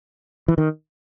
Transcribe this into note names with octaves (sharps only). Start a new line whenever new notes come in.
E3
D#3